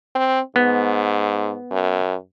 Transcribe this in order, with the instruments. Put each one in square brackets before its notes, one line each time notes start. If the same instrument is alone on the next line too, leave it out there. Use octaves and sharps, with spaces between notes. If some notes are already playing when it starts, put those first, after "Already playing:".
[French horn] C4
[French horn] G#2 [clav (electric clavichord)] B3
[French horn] F#2